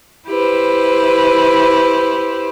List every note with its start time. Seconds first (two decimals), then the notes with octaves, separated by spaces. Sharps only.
0.28 E4 G4 B4 C5